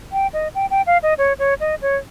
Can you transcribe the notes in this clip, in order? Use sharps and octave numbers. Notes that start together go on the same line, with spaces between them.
G5
D#5
G5
G5
F5
D#5
C#5
C#5
D#5
C#5